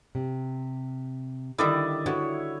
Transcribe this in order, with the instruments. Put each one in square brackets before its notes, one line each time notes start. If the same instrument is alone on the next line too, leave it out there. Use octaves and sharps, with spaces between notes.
[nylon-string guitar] C3
[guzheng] D3 D#3 G3 [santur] E4 D5 D#5
[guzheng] D3 [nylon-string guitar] E4 F#4 [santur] C#5